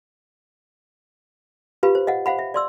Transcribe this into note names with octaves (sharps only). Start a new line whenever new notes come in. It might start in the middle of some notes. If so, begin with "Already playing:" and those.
F4 G4 B4 F5 B5
C5
D#5 F5 F#5
C5 F5 F#5 B5
E5
D5 C6 E6